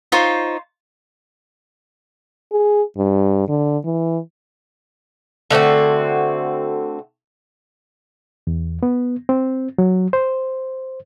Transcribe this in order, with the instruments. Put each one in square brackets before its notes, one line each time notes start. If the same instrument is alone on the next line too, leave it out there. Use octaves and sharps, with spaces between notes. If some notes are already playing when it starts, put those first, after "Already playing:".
[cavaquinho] D#4 F4 C5 C#5
[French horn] G#4
G2
D3
E3
[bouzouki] D3 A3 C4 F#4
[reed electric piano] E2
B3
C4
F#3
C5